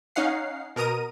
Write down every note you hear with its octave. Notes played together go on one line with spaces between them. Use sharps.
C#4 D#4 F5 F#5 C7
B2 A#4 A#5 D#6 D#7